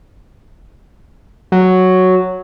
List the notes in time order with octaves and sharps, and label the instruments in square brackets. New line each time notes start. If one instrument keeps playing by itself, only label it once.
[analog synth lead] F#3